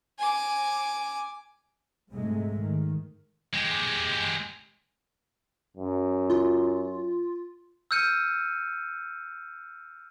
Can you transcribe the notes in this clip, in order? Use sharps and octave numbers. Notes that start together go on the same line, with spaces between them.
G#5 D6
G#2 C3 G#3 A3
D#3
G#3 G4
F#2
F4
E6 F6 G6 C#7 D#7